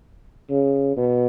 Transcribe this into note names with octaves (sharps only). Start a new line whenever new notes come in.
C#3
B2